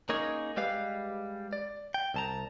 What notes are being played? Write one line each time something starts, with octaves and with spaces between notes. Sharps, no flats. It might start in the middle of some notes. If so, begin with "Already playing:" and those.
A#3 C#4 D#4 G#4 A#4 C#5
G3 G#3 G4 B4 F5
D5
G5
C2 A5 A#5